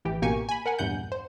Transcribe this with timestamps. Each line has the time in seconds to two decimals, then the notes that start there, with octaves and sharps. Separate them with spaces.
0.05 A1 E3 G4
0.22 A1 B2 A#3 G4 G#5 C#6
0.49 G#5 B5
0.66 A#4 F#5 G#5
0.79 A#1 E2 G2 F#5 G6
1.12 C5